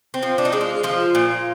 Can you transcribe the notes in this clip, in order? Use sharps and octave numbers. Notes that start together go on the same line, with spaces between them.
C4
F3
D4
D#4
G#3 D4
F4
F3 F4
A#2